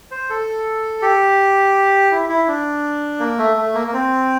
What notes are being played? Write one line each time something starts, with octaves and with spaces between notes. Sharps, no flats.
C5
A4
G4
E4
E4
D4
A#3
A3
A3
A#3
A#3
C4